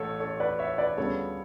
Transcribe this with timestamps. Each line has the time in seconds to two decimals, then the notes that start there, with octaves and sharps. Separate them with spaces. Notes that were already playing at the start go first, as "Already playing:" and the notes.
Already playing: A1 A2 A3 A4 C#5
0.20 A4 C#5
0.40 B4 D5
0.59 C#5 E5
0.78 B4 D5
0.97 D2 C#3 G3 B3 A4 C#5